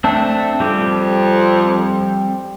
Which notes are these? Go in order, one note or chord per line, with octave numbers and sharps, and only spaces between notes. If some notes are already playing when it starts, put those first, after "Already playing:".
A3 C4 D4
F2 G3 C4 G4